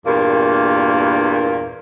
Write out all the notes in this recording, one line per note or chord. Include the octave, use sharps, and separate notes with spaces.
E2 G2 A#2 A#3